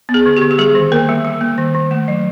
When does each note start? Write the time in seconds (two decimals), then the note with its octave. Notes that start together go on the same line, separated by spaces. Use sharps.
0.09 B3
0.14 G#4
0.26 D3
0.37 G4
0.42 D3
0.51 G4
0.58 G3 G#4
0.75 D#3
0.92 A#3 A#4
1.09 G3
1.25 G3
1.41 A#3
1.58 D#3
1.75 D#3
1.91 A3
2.08 F#3